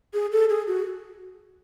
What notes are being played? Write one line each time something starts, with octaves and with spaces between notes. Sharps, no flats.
G#4
A4
G#4
F#4